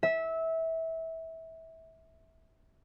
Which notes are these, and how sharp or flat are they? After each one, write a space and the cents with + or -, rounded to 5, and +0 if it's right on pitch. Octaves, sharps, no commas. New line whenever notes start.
E5 -20